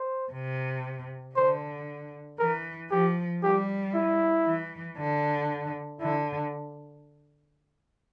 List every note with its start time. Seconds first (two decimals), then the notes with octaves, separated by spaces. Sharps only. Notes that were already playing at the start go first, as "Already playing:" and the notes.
Already playing: C5
0.32 C3
1.35 D3 C5
2.39 E3 A#4
2.90 F3 G4
3.42 G3 G4
3.95 E4
4.46 E3
4.97 D3
6.00 D3 E4